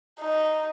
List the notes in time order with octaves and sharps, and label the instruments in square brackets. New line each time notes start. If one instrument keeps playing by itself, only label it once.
[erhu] D#4